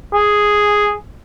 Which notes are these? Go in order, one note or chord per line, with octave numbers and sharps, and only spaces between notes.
G#4